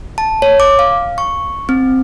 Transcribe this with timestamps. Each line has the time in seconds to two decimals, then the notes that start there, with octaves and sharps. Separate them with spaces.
0.18 A5
0.42 C#5
0.60 D6
0.79 F5
1.18 C#6
1.69 C4